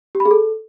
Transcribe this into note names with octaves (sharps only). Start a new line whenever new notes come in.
G4
B5
G#4
A4